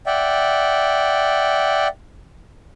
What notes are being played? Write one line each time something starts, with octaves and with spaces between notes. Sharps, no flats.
D5 E5 F#5 G5